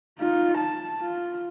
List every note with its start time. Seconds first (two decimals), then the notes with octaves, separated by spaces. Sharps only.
0.18 D#4 F4
0.58 A5
1.00 F4